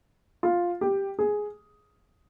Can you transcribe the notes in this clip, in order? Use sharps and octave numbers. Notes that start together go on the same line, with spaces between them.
F4
G4
G#4